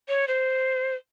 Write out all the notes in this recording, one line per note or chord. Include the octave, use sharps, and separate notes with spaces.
C#5
C5